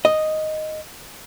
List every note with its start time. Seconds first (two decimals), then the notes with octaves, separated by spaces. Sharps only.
0.05 D#5